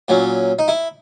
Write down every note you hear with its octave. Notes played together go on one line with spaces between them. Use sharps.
A#2 F#3 C#4
D#4
E4